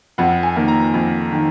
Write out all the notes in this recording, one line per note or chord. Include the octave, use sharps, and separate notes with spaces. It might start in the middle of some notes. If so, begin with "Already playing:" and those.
F2 F#5
G#5
D#3 A#3
A#5
F2
D#3